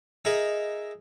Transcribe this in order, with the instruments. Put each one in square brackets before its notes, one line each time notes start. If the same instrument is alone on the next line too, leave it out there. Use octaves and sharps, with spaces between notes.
[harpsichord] D#4 G#4 A#4 E5